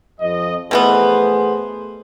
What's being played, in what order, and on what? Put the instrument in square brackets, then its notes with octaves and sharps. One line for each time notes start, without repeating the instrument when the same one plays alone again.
[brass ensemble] F2 D#5
[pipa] B2 E3 B3 [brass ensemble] A3 G#4 C5